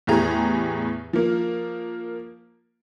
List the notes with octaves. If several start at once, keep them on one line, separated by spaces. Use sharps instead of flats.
E2 A2 G4 G#4 A#5
F3 A#3